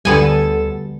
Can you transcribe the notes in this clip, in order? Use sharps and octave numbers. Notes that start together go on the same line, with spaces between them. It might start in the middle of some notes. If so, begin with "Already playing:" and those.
D2 D3 G3 B3 A4 G#5